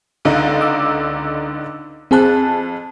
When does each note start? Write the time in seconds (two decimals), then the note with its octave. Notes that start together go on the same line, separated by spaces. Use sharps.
0.25 C#2 D3 D#4
0.61 D6 E6
2.11 F2 C4 G#4 A5 F#6